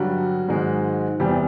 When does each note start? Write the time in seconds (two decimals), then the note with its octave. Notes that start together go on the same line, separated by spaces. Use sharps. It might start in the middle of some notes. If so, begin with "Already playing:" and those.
Already playing: G2 D3 F#3 G3 F#4
0.49 G#2 D#3 G#3
1.20 E2 C3 E3 G3 G4